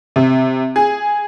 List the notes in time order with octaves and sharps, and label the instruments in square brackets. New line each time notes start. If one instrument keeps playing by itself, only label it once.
[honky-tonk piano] C3
G#4